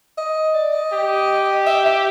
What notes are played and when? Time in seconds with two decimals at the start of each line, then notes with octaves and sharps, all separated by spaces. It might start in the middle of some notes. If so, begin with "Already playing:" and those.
0.18 D#5
0.54 D5
0.73 D#5
0.92 G4
1.67 E5
1.86 E5